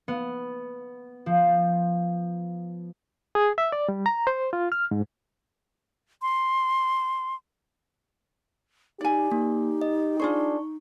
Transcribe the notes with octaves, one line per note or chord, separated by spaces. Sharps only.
B3
F3
G#4
E5
D5
G3
A#5
C5
F4
F6
G#2
C6
D#4 G4 D5 G#5
A#3 D#4
D#5
D4 F4 G#4 C5 C#6